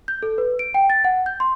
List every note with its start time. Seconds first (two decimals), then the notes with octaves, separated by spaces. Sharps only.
0.08 G6
0.23 A4
0.38 B4
0.59 D7
0.74 G5
0.90 A6
1.05 F#5
1.26 G6
1.40 C6